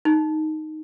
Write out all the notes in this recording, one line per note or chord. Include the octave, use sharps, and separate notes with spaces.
D#4